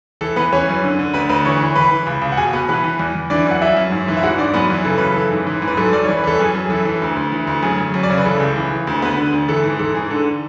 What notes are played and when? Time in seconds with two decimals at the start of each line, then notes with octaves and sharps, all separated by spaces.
0.21 E3 A4
0.36 E3 B3 B4
0.53 E3 C#4 C#5
0.68 F#2
0.83 D3
0.99 D3
1.14 D2 B4 B5
1.29 D2 B4 B5
1.45 E3 C#5 C#6
1.61 E3
1.75 E3 B4 B5
1.91 E3
2.07 C#2
2.22 C#2
2.32 F#5
2.37 B2 G#4 G#5
2.53 B2 B3 B4
2.68 E3 B3 B4
2.84 E3
2.99 E2
3.15 E2
3.30 E3 D4 D5
3.46 F#2
3.51 F#5
3.62 F#2 E4 E5
3.77 F#2
3.92 G#2
4.08 E3
4.17 E5
4.23 G#2 F#4 F#5
4.38 G#2 D4 D5
4.54 F#2 B3 B4
4.70 E3
4.85 C#3 A4
4.98 F#2 B4
5.12 E3 A4
5.32 G#2
5.47 E3
5.62 G#2
5.67 B4
5.77 F#2 A4
5.93 F#2 D5
6.04 E3 C#5
6.17 B4
6.24 E3 A4
6.39 F#2 G#4
6.55 F#2
6.66 G#4
6.70 E3 A4
6.85 E3
7.02 D2
7.16 D2
7.32 E3
7.47 D2
7.63 F#2 G#4
7.78 F#2
7.94 F#2
8.03 D5
8.10 C#3 C#5
8.18 B4
8.25 E3 A4
8.40 C#2
8.56 E3
8.71 E3
8.87 D2
9.02 D2 B3 B4
9.17 D3
9.33 D2
9.48 E3 A4
9.64 G#2
9.79 E3 A4
9.95 G#2 G#4
10.10 D3 A4